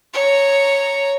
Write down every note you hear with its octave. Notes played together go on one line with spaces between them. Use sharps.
C#5 A#5